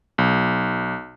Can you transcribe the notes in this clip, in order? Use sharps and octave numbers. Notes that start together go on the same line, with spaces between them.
B1